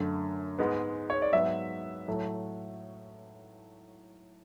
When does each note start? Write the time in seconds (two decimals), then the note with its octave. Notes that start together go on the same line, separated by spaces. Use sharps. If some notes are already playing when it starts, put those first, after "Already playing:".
Already playing: F#2 D3 A3
0.59 G#2 G#3 B3
1.10 C#5
1.22 D5
1.33 G#2 F#3 B3 E5
2.08 A2 F#3 A3